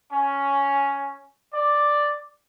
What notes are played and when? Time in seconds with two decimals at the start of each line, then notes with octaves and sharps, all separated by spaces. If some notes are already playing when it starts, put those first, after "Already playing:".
0.12 C#4
1.53 D5